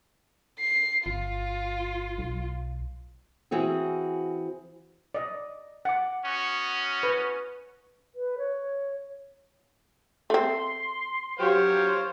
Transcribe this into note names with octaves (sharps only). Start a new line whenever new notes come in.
C7
G1 F4
B1
E3 C4 F#4 G#4
D5 D#5
F#5 D6
B3 C#4 F#4
B4
B4
C#5
A3 C4 C6
F#3 G4 C5 C#5 F5